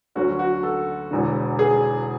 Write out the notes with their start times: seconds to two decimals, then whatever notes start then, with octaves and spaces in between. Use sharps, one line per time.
0.16 D2 D3 F#3 C#4 F#4
0.39 F#4
0.63 A4
1.11 E1 E2 D3
1.59 G#4